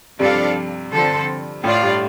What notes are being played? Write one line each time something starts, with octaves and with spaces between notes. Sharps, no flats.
G2 C3 F3 D4 A4 D5 F5
D3 F3 C4 A4 C5
A2 A3 F4 D5 F5
G2